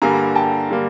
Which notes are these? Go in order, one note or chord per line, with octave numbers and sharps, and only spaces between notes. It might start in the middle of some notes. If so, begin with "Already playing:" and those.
G2 D3 G3 A#3 G#5 A#5
G5 A5
D3 G3 A#3